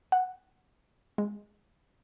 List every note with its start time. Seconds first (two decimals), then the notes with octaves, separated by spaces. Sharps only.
0.12 F#5
1.18 G#3